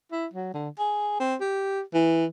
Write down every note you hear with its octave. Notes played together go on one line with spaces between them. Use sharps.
E4
F#3
D3
G#4
C4
G4
E3